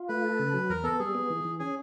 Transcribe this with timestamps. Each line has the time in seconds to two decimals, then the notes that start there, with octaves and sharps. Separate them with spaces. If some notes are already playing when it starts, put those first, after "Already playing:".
Already playing: F4
0.09 A3 B4
0.25 A4
0.39 C#3
0.54 F#3
0.70 E2 A#4
0.84 B3 A4
0.99 G3 G#4
1.15 B3
1.30 E3
1.45 E3
1.59 C#4 G#4